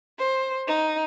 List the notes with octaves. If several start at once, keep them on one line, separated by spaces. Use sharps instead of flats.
C5
D#4